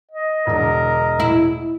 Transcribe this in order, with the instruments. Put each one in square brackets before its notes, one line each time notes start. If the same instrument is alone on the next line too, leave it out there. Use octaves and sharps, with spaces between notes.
[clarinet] D#5
[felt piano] E1 D3 D4 [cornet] A#4
[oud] E4